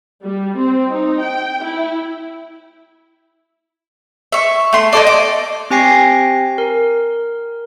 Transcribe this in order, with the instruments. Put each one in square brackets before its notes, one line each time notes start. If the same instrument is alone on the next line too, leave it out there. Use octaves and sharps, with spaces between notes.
[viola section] G3
C4
D#4
G5
E4
[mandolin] E5 C#6
A3 C6
D#4 G#4 A4 D5
D6
[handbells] C4 G4 G5 G#5 A#6 C7
A#4